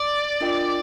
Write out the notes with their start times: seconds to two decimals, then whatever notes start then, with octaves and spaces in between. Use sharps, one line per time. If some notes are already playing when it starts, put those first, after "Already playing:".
Already playing: D5
0.41 D4 F4 A#4 D#5 G5